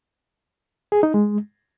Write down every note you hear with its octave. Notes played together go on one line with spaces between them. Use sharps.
G#4
D#4
G#3